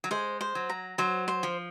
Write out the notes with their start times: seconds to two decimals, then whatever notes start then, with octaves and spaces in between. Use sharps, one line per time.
0.04 F#3
0.11 G#3 C5
0.41 C5
0.55 F#3
0.70 A#5
0.98 F#3 C5
1.28 C5
1.43 F3